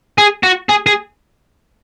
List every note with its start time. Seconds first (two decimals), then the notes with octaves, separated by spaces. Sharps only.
0.18 G#4
0.43 F#4
0.69 G#4
0.86 G#4